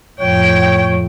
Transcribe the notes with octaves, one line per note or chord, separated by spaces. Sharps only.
F2 A2 C#5 G5